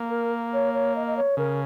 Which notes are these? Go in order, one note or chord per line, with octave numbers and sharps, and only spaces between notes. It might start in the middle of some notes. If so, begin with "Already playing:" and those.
Already playing: A#3
A#4
C#5
C#5
D#5
D#5
C#5
C#3 A#4